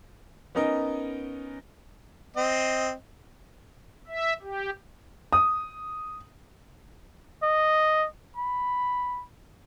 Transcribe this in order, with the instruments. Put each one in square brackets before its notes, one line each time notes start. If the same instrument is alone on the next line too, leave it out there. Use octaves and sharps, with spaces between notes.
[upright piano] B3 C#4 D#4 A#4 D#5
[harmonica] C4 D#5
[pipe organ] E5
G4
[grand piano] D#6
[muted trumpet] D#5
B5